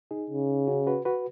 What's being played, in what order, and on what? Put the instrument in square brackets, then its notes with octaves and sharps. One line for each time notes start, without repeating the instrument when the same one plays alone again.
[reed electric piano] D#4 G#4
[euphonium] C#3
[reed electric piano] C#4 F#4
F#4 B4
F#4 B4